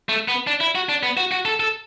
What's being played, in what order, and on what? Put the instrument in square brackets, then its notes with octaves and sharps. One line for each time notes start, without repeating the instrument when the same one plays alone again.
[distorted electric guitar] A3
B3
D4
E4
F#4
D4
B3
F#4
F#4
A4
A4